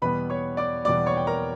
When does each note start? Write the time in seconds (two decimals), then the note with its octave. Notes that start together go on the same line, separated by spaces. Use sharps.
0.02 E2 B2 G3 B3 B4 B5
0.30 C#5 C#6
0.57 D5 D6
0.85 E2 B2 G3 B3 D5 D6
1.06 C#5 C#6
1.17 G5
1.27 A#4 A#5